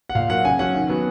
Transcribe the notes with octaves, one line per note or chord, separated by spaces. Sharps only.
F#5
A#2 F5
F#3 A#3 F#5
C#3 G#5
F#3 C#4 F#5
D#3
F#3 B3